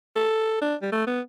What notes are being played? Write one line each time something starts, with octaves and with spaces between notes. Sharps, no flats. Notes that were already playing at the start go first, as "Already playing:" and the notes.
A4
D4
G3
A3
B3